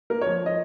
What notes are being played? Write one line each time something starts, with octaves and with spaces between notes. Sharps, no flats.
A#3 A#4
F3 C#5
F3 D#5